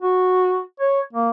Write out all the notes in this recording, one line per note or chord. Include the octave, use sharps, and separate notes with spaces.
F#4
C#5
A#3